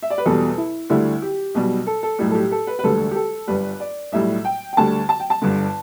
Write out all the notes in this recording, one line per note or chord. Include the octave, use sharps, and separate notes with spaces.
E5
D5
B4
E2 B2 G3 A4
E4
D2 D3 G3 E4
G4
B1 B2 G3
A4
A4
B1 A2 G3 G4
A4
G4
A4
B4
B4
E1 D2 D3 G3 A4
G4
A4
G1 G2 G3 B4
D5
B1 A2 G3 E5
G5
G5
D2 D3 G3 A5
A5
G5
A5
G1 G2 D3